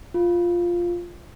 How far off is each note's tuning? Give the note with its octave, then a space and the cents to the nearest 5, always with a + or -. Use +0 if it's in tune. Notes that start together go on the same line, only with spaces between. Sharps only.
F4 +0